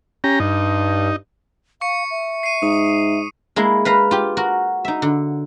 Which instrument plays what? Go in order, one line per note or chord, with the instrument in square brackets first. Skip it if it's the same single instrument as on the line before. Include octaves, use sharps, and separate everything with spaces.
[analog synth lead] C#4 [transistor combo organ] G4 A#5
[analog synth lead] G2 [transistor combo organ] D#4
[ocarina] F5 [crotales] C#6 C#7
[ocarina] E5
[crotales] C7 D#7
[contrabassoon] G#2 [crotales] D#6
[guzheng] G#3 A#3 E4
B4 F5 A#5
F4 G4
F#4 A#4
D#4 E5
D3